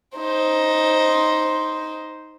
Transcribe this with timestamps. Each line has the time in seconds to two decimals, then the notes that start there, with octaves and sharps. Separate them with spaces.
0.16 D#4 C5